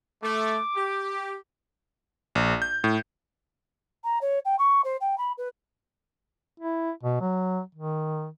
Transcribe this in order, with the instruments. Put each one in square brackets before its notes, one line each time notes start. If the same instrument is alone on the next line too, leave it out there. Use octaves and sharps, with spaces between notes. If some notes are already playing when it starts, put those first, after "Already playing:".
[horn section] A3 [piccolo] D6
[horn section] G4
[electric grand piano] A#1
G6
A2
[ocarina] A#5
C#5
G5
C#6
C5
G5
B5
B4
[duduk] E4
B2
F#3
D#3